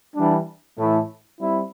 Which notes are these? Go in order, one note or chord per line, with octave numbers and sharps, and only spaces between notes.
E3 G3 D4
A2 E3 A3 E4
G3 C4 E4